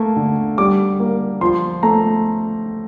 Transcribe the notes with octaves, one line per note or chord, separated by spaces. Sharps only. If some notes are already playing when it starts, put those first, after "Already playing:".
Already playing: A3 A#3
D3
G3 D6
A#3
F3 C6
A3 A#5